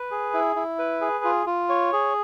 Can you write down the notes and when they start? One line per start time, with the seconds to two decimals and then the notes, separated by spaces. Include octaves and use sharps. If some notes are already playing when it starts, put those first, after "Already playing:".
Already playing: B4
0.11 G#4
0.34 E4
0.56 E4
0.79 B4
1.01 G#4
1.24 F4
1.47 F4
1.69 C#5
1.93 G#4